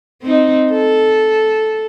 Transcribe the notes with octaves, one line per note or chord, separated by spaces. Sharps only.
C4 D#4
A4